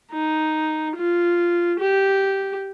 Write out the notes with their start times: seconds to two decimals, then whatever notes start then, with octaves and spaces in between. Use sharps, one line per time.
0.12 D#4
0.96 F4
1.79 G4